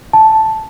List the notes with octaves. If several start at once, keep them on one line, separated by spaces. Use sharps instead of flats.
A5